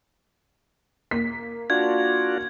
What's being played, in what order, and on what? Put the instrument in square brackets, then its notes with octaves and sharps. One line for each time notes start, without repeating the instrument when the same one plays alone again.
[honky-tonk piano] A#3 B6
[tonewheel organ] D4 F4 F#4 [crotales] G#6